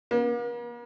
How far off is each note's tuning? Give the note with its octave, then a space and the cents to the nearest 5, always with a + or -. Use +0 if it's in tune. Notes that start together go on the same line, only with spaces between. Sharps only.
A#3 +45